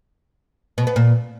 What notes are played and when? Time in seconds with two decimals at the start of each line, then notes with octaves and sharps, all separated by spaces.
0.78 B2
0.87 B3
0.96 A#2